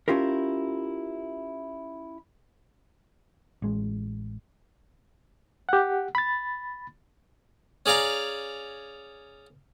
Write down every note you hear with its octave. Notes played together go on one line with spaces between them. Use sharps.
C#4 E4 F4 G4 A#4
A1 G#3
G4 F#5
B5 A6
C#4 G#4 D5 F5 A#5